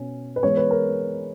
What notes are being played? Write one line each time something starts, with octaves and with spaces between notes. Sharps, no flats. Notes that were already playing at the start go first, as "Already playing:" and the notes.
Already playing: B2 C#4
B4
E3 G#3 B3 C#5
B4
A#4